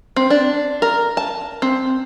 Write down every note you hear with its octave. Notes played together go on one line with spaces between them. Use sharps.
C4
D4
A#4
A5
C4